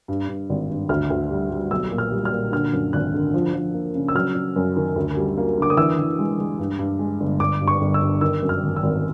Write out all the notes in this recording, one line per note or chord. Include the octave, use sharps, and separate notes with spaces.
G2
G2
G#1
G2
D2 F6
D2
G3
G3
B1 E6
A#2
F6
G3
F6
A#2
D3 F6
F#2
G#1 F#6
D3
F3
F3
A#3
C#3
E6
F#3 F6
F#3
F#2
D#3
D2
G3
A#3
D3 D6
D#6
E3 E6
E3
G#3
G#3
G2
G2
G#3
G1
G1 D6
G2
C#6
G1
E6
G2
D#3 E6
F#2
F6
G#1
E6
G#1